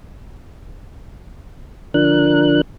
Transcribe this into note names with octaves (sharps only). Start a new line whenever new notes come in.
D3 F3 D4 A#4 F#6